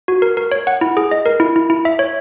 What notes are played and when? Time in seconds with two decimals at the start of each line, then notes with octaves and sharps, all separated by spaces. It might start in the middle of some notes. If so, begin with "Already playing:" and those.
0.08 F#4
0.22 A#4
0.37 A#4
0.52 C#5
0.67 F#5
0.81 E4
0.97 G#4
1.11 D#5
1.26 A#4
1.40 E4
1.56 E4
1.70 E4
1.85 E5
1.99 C#5